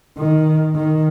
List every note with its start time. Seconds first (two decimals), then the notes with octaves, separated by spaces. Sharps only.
0.17 D#3
0.75 D#3